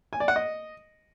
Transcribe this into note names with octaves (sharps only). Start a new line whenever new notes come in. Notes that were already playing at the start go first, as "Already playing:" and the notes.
G#5
D5
F#5
D#5